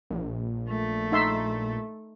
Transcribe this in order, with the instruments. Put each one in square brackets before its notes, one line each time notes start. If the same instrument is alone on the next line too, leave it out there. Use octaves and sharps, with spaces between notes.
[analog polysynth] A#1
[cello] A3
[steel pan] D#4 E5 C6